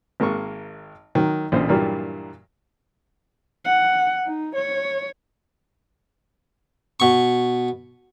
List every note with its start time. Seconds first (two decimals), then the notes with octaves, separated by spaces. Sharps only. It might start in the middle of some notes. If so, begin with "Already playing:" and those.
0.20 G#1 G#3 A#3 C#6
1.15 D#3 F#3
1.52 A1 A#2 D3 C5
1.69 G2 A#2 E3 F#3 G3 A#3
3.65 F#5
4.26 D#4
4.56 C#5
7.00 B2 C#6